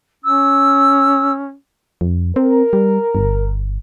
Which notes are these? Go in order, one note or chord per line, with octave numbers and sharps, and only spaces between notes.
C#4 E6
F2
C4 A#4
G3
G1